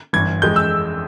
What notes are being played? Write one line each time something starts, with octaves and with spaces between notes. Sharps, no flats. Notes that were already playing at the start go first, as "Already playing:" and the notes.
G1 G2 E3 G#6
F2 E3 G#3 G6
E6